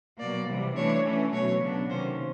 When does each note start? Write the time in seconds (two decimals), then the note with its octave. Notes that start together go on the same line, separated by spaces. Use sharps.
0.20 B2 F#3 A#3 D5
0.48 C3 E3 G3
0.76 E3 A3 D4 C#5
1.04 E3 A3 C#4
1.32 B2 F#3 A3 C#5
1.61 C#3 F#3 B3 D4
1.89 C3 D#3 F#3 A#3 C#4 C5